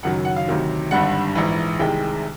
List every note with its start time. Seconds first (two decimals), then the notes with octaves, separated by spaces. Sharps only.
0.03 F#1 F#2 D#3 F#3 F#5
0.25 F#5
0.36 F5
0.48 D2 C3 D#3 F#3
0.91 G#1 G2 D3 G3 F#5
1.35 A#1 G#2 E3
1.79 C2 C3 D#3 G#3 G5